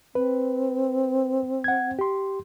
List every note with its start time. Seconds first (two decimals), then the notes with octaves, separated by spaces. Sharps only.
0.15 C4 B4
1.64 F#5 G#6
1.99 G4 C6